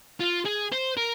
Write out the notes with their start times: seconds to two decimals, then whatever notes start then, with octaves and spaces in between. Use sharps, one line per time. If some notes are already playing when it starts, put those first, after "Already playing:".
0.20 F4
0.45 G#4
0.72 C5
0.97 A#4